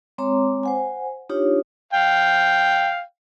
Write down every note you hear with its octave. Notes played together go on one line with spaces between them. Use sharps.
G#3 C4 C#5 A#5 C6 D6
C5 F#5 G#5
D4 D#4 F4 G4 C#5
F5 G5